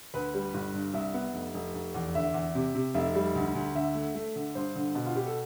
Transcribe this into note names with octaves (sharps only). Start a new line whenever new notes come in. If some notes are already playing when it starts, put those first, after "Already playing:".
D2 B4
G3
G1
G2
C2 E5
B3
F1
F1
F1
E2
D3 E5
E2
C3
C3
F1 E5
G3
D2
D2
D3 E5
A3
A3
D3
G2 C5
D3
B2
F4
B2 G4
A4